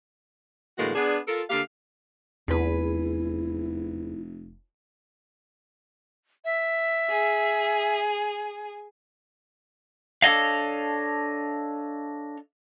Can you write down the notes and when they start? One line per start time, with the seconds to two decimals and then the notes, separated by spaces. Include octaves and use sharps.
0.78 A2 D3 E3 G#3 A#3 F#4
0.95 B3 D4 G#4
1.28 F4 A4 A#4
1.50 D3 A#3 G4 F5
2.48 F1 E2 E4 G#4 B4
6.45 E5
7.09 G#4
10.22 D4 A4 C#5 D#5 F5